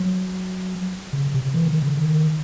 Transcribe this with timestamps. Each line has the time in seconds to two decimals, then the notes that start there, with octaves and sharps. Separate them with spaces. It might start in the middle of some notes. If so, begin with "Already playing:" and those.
Already playing: F#3
1.13 C#3
1.34 C3
1.54 E3
1.68 D#3
1.82 C#3
1.97 D#3